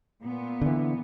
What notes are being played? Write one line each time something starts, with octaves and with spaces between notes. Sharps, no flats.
A#2 B3
D3 E3